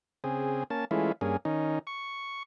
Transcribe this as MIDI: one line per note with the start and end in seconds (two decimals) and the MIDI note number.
0.24 0.64 49
0.24 0.64 60
0.24 0.64 68
0.70 0.85 58
0.70 0.85 61
0.70 0.85 81
0.91 1.12 52
0.91 1.12 56
0.91 1.12 57
0.91 1.12 61
0.91 1.12 64
0.91 1.12 65
1.21 1.37 43
1.21 1.37 58
1.21 1.37 61
1.21 1.37 68
1.45 1.79 51
1.45 1.79 61
1.45 1.79 63
1.87 2.43 85